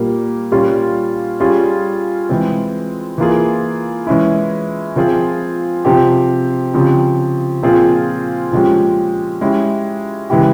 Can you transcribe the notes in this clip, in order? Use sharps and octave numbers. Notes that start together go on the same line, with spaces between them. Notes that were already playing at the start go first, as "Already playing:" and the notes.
Already playing: A#2 G3 A#3
A#2 G3 C#4 F4
G3 C#4 F4 G#4
E3 G#3 C4
E3 A#3 F4 G#4
E3 G#3 C#4 E4
F3 C4 F4 G#4
C3 F3 C4 G4
C#3 F3 C4 G4
A#2 F3 C4 F4 G#4
A#2 F3 G#3 C#4 G4
G#3 C#4 E4 G4
C#3 E3 G#3 E4 G4